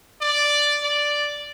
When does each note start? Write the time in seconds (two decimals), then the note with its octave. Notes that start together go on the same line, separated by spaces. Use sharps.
0.21 D5
0.83 D5